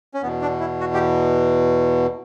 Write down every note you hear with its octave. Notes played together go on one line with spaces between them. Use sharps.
C#4
E2 B2 B3
D4
E4
F#4
G4